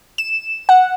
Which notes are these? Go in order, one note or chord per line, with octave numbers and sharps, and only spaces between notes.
E7
F#5